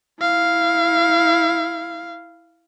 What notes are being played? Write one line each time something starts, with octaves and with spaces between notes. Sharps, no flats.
E4 F5